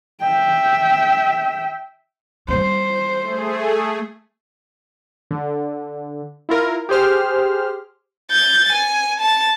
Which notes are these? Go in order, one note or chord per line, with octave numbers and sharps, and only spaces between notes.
E5 G5
G3 C4 C5
A3 G#4
D3
E4 F4 A#4
G4 G#4 C5 F6
G6 A6
G#5
A5